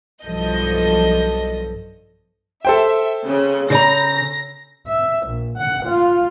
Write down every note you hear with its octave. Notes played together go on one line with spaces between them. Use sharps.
B1 G2 F3 A4 D#5 G6
A4 C5 E5 G5
C#3
C#3 D5 A#5 A#6
E5
A#1
F#5
F4